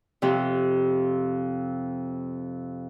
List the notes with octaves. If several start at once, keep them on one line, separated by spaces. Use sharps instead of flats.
F2 C3